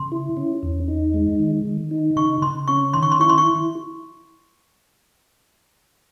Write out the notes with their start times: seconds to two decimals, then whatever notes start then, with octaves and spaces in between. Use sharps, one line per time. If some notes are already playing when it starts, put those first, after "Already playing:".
Already playing: C#3 C6
0.12 E4
0.37 C#4
0.63 E2
0.88 D#4
1.14 G#3
1.39 D#3
1.65 D#3
1.91 D#4
2.16 C#3 C#6
2.42 C#3 C6
2.68 C#4 C#6
2.94 D#3 C6
3.03 C#6
3.12 C6
3.20 E4 C#6
3.29 C6
3.38 C#6